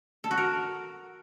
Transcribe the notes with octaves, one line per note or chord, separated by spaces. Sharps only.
A4
F#4
A#4